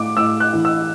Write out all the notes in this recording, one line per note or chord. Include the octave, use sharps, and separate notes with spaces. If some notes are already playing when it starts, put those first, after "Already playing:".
Already playing: A2 D6
A2 E6
F#6
E3
E6